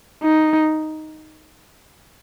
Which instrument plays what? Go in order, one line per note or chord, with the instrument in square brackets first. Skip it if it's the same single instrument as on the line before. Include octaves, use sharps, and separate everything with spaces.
[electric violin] D#4